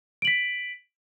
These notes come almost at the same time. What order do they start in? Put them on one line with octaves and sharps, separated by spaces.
D7 F#7 B6